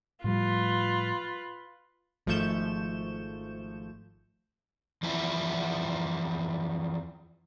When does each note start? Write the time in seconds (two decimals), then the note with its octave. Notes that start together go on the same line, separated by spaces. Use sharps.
0.24 A2 F3 G3 F4 B4
2.26 G#1 F3 A3 C#6 G6 E7
5.03 E2 F3 E4